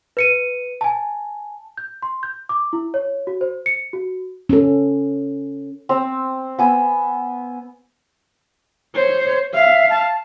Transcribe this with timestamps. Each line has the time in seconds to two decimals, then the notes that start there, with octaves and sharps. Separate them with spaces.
0.17 B4 C#7 D#7
0.81 G#5 A5
1.77 G6
2.02 C6
2.23 G6
2.49 D6
2.73 E4
2.94 C#5
3.27 F#4
3.41 C5
3.66 C#7
3.93 F#4
4.49 C#4 A4
5.89 C4 E6
6.59 B3 G#5 E6
8.96 C5 C#5
9.54 E5 F5
9.90 A5